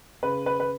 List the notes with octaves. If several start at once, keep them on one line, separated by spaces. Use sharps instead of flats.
C#3 B4
B4
B4